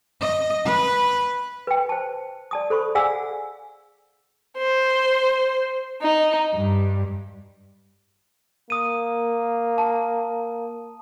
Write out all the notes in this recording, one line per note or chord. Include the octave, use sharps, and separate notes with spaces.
D#5
B4
B4 G5
C5 A5
D5 A5 D#6
A4 C5 B5 C#6
G#4 D5 F5 F#5 G#5 E6
C5
D#4
G2
A#3 D#6 D#7
A5